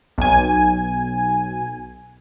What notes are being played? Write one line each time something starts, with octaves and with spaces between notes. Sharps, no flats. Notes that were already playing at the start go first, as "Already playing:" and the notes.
B1 G#5